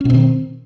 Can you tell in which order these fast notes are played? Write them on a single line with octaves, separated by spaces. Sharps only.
C#4 B2 C4 D#3